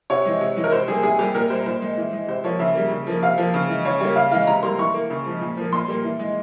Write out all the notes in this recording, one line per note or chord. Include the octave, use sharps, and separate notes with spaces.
C3 C#5
E3 G#3
C3
E3 G#3
A#4
C3 C5
G3 A#3 G#4
C3 G#4
G3 A#3 G4
A#2 A#4
G3 A#3 C5
A#2 C5
G#3
E3
G#3
C3 C5
F3 A#3 C#5
C#3 E5
G3 A#3
C#3
F3 A#3
C3 F5
F3 A#3
C#3
E3 G#3
C#3 C#5
G3 A#3 C#5
C#3 F5
E3 G#3 F5
C3 A#5
G3 A#3 C6
E3 C#6
A#3
C#3
F3 G#3
A#2
F3 A#3
A#2 C6
G3 A#3
E3
G#3